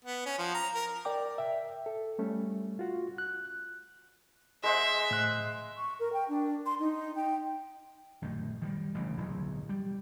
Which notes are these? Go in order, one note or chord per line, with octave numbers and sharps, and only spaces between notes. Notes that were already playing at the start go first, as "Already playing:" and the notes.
B3
C#4
F3
A#5
A#4
A#4 D5 G5 D6
E5 G5
A4
G3 A3 C#4
F4 F#4
F#6
G#3 C5 E5 F#5
A2 F#6
C#6
A#4
G5
D4
C6
D#4
G5
A#1 F#2 D#3 A3
D#3 F3 G3
A1 D2 C#3
D1 B1 E2 F#3
G3